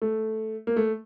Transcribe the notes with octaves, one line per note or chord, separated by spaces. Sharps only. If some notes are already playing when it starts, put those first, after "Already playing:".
A3
A#3
A3